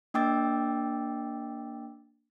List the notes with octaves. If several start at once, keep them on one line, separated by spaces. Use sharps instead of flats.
A#3 D4 G5 D6 E6 A6